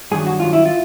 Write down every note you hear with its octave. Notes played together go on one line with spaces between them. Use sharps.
G2 D#3 F#3 G#4
F#4
G2 D#3 F#3 F4
E4
F4